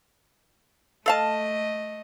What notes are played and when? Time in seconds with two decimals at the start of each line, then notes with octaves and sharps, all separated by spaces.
1.06 A3 A4 D#5 F5 A5